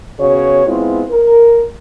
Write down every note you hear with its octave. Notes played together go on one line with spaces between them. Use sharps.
C#3 B3 F#4 C#5
G#3 B3 C4 E4 F4
A#4